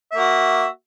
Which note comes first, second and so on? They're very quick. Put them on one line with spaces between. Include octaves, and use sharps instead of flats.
E5 A#3 F#4